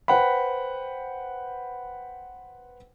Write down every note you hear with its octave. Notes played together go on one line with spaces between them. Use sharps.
B4 C5 F#5 G5 B5